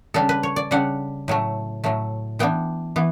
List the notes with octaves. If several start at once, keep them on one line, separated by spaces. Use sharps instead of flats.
C#3 G3 D4 A4
B4
C#5
D5
C#3 G3 D4 F#5
A2 F#3 A3
A2 F#3 A3
E3 B3 D4 G5
E3 B3